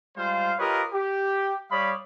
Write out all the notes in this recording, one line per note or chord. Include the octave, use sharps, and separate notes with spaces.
G3 G#3 F4 C5 F5
F4 G4 A#4 B4 C#5 D#5
G4
G3 C#5 D5 F5 B5 D#6